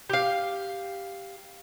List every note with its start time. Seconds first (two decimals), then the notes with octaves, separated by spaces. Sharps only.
0.10 G4 F5